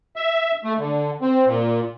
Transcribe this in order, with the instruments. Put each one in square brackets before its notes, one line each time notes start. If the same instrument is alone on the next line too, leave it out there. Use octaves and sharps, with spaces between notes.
[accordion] E5
A3
D3
C4
A#2